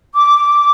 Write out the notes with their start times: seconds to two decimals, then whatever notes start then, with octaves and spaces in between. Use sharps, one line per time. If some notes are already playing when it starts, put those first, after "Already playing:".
0.14 D6